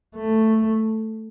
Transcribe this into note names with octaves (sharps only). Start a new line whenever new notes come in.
A3